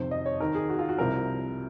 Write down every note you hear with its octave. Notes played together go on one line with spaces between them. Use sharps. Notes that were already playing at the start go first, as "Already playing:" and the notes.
Already playing: F2 C3 D#3 C5
D#5
C#5
D#2 D#3 A#4
G#4
F#4
F4
F#4
C2 C3 F3 A#4